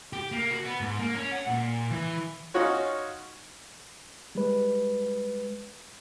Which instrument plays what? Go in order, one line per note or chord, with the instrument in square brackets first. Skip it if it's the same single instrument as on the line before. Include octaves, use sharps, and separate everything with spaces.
[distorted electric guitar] G4
A#3
F#4
B3
G#2
A#3
C#4
F#5
A#2
E3
[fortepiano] C#4 D#4 F4 F#4 C#5
[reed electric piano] G3 G#3 B4